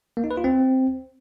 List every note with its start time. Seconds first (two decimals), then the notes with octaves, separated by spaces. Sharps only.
0.17 A#3
0.24 D#4
0.31 B4
0.37 F4
0.44 C4